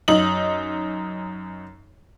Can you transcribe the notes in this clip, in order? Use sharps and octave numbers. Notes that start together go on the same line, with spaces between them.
F#2 D#4 F#7